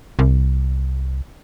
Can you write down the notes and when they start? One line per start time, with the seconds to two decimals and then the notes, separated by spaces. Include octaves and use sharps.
0.19 C2